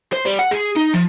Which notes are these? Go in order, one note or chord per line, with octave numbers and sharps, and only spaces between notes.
C5
G3
F#5
G#4
D#4
F3